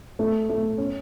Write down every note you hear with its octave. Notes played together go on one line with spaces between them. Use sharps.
A3
A3
C#4